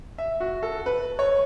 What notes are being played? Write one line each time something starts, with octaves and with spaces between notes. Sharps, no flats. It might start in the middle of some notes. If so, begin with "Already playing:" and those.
E5
F#4
A4
B4
C#5